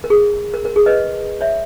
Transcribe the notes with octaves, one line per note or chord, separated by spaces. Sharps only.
A#4
G#4
A#4
A#4
G#4
B4 D#5
C#5 E5